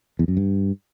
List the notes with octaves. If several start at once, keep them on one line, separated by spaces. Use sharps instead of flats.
E2
F#2
G2